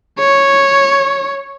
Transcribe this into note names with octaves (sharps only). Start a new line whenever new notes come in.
C#5